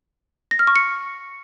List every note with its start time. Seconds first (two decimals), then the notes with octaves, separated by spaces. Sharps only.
0.51 A#6
0.59 F6
0.67 C#6
0.76 C#7